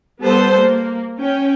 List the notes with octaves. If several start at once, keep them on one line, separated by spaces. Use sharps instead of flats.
G3 B3 A4 B4 C5
A#3
C#4 G5